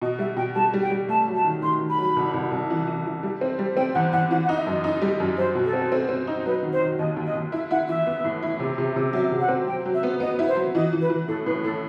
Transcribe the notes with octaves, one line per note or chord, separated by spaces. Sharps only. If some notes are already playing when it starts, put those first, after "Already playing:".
B2 D#5
G3 E5
B2 G5
G3 A5
G3
G5
G3
A3 A5
F#3
A5
D#3
D#3 C6
D#3
B5
F#3
C2
C2
C2
E3
E3
E3
G3
C4
G3
C4 G5
E2 F#5
E2 F#5
E3 F#5
F#5
D#4
E5
F#2 D#5
D#4
G3
F#2
F#3 C5
B2
A4
C4
C4
C4
D#4
F#3 B4
D#3
C5
D#3
D#2 D#5
D#2
D#5
D#2
E4 E5
E4 F#5
E3 E5
B3
A2
E4
C3
C3
C3
F#3 E5
C3
F#5
C4
F#3 G5
F#3
E5
B3
B3 D#5
E4
C5
F#3
E3 D#5
E3
B4
E3
A2 A4
A2 B4
A2 A4